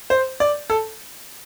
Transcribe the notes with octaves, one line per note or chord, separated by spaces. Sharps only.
C5
D5
A4